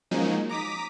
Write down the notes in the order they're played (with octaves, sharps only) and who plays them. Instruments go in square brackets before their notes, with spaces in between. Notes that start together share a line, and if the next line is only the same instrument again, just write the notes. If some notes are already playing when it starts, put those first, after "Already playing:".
[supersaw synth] F3 F#3 G#3 A#3 C#4 D#4
A#5 D6 D#6 B6